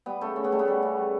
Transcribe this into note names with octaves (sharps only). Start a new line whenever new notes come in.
G3 B3
C#3 A3
C#3 C#4
B3
G3 A3
B3
G3
C#3
G3